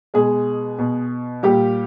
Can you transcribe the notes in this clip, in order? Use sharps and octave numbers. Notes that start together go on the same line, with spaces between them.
B2 G#3 G#4
B2
A#2 G3 G4